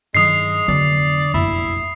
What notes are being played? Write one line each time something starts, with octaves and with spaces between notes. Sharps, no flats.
G2 D#3 F#3 G#3 D#6 C7
F1 D3 F#3 B3 D5
F1 A#1 F#2 E4